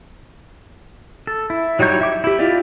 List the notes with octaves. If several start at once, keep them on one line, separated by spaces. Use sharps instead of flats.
A4
E4
F#3 G3 D#4 C#5 G6
E5 D6
E4 G4
E4 F4 G4 D5 D#5